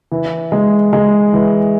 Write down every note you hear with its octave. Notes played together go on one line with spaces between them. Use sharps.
E3
G#3
G#3
E3